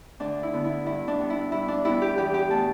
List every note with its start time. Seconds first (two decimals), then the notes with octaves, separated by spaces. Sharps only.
0.20 D2 D4
0.43 E4
0.53 D3 B3
0.64 E4
0.86 G2 E4
1.08 D4
1.19 G3 B3
1.30 E4
1.52 G2 E4
1.68 D4
1.84 G3 B3 E4
2.02 G4
2.17 E2 G4
2.34 G4
2.50 B2 A3 A5